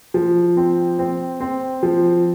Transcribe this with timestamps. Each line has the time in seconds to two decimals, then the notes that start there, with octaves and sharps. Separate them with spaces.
0.14 F3
0.57 C4
0.99 C4
1.40 C4
1.83 F3